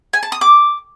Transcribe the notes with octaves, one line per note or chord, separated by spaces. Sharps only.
G#5
A5
D#6
D6